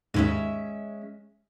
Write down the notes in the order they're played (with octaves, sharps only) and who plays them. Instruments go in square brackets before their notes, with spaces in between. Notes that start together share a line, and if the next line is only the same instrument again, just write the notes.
[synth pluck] D#2 G#2 [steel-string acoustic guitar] G#3 C#4 E5